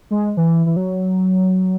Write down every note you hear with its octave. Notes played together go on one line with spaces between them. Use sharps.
G#3
E3
E3
F#3